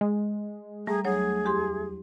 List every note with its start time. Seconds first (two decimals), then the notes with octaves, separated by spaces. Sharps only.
0.01 G#3
0.87 G3 A3 G#4 A#5
1.05 D2 F#3 G#4 C#5
1.45 E2 G4 C6